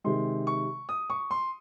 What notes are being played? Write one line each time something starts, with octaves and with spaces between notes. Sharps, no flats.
C3 D#3 G#3 C6
C#6
D#6
C#6
C6